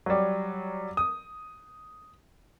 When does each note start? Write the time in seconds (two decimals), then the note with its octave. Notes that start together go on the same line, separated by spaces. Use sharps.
0.06 F#3 G3
0.97 D#6